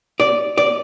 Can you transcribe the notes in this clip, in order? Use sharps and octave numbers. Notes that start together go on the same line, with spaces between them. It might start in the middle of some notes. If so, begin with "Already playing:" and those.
D5
D5